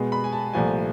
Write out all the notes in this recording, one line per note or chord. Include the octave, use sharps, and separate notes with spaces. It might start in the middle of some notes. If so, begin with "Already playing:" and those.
Already playing: B2 G#3 B3
B5
G#5
A5
C2 A#2 F3 A3 G#5